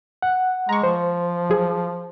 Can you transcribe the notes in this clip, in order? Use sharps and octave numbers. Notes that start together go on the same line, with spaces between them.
F#5
G#3 A#5 C#6
F3 C5
F#3 G#4